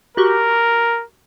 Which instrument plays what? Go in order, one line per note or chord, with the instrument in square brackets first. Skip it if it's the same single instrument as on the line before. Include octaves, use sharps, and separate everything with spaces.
[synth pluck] F#4 G4 C#6 [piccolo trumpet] A#4